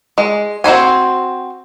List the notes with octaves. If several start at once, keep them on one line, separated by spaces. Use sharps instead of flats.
G#3
C4 F#4 C5 G#5